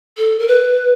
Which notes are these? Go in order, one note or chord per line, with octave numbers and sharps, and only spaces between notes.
A4
A#4
B4